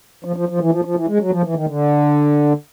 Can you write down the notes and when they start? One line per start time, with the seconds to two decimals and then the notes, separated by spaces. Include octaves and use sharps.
0.25 F3
0.36 F3
0.49 F3
0.60 E3
0.72 F3
0.85 F3
0.95 E3
1.08 G#3
1.20 F#3
1.31 F3
1.44 E3
1.55 D#3
1.68 D3